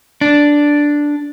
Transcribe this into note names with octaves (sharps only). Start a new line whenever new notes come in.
D4